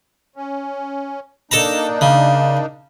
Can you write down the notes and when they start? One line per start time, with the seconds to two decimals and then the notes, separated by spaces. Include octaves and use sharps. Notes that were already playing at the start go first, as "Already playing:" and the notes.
0.36 C#4
1.51 A#3 D4 D#4 A4 A5 A#5
2.01 C#3